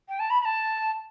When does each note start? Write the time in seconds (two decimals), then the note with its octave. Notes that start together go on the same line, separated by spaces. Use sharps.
0.08 G5
0.19 A5
0.30 B5
0.40 B5
0.45 A5